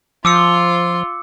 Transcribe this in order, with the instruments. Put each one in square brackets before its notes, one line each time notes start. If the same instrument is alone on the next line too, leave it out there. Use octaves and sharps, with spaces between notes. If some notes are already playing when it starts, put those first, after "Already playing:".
[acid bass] F3 [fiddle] F4 C6 [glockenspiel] D6 E6 C#7